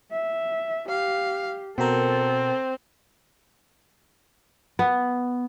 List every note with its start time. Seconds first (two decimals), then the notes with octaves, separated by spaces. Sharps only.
0.12 E5
0.89 G4 F5
1.78 B2 C4 F#4 A4 A#4
4.79 B3